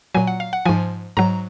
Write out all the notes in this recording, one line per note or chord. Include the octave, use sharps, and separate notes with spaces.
A#2 F#3 G#5
F#5
F5
F#5
G#2 F3 G#5
G#2 F#3 A#5